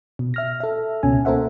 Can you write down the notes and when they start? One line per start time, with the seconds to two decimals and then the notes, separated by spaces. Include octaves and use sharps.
0.19 B2
0.34 E5 F6 A#6
0.60 A4 E5
1.03 C#2 B2 C#4 G#5
1.25 A#3 A4 A#4 C5 E5 F#5